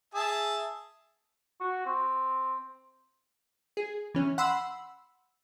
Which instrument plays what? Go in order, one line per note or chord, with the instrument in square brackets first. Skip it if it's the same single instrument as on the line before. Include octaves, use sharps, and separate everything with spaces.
[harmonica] G#4 E5 A5
[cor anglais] F#4
C4
[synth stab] G#4
E3 C#4
F#5 B5 C6 E6